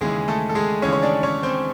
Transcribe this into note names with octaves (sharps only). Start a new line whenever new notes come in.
D#2 C#3 E3 G#3 G#4
A3 A4
A4
G#3 G#4
D#2 C#3 E3 C#4 C#5
C#5
D4 D5
C#4 C#5
C4 C5